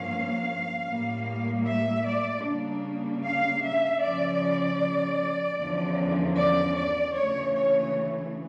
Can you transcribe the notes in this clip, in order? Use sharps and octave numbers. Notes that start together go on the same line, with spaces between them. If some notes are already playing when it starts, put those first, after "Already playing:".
Already playing: G2 F3 A#3 C#4 F5
A2 G3 A#3
E5
D5
C#3 G3 A#3 D4
F5
E5
C#3 F3 C#4 D5
E2 D3 F3 C#4
D5
D5
D2 C#3 E3 A3 C#5
C#5